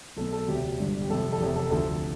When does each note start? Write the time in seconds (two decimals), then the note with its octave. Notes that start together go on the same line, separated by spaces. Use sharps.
0.17 B1 B2 A3 C4 A4
0.33 A4
0.48 E1 D2 C3 G4
0.79 G1 G2 D3
1.02 G4
1.09 G1 F2 C3 A4
1.33 A4
1.41 F1 E2 C3 G4
1.56 A4
1.71 D2 D3 F3 C4 A4